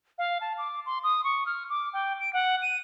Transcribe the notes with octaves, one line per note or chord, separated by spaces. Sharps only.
F5
A5
D6
C6
D#6
C#6
F6
D6
G5
D7
F#5
D#7